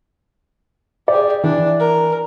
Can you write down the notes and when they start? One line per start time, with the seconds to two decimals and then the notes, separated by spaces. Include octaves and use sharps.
1.08 G4 G#4 D5
1.44 E3 D4
1.79 A#4